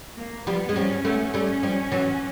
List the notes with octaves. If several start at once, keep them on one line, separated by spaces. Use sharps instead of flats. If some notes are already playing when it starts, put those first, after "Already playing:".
A#3
F3 G3 B3
G#3
F3 G3 C#4
A3 B3 C#4
G3 A3
F3 G3
E3 F#3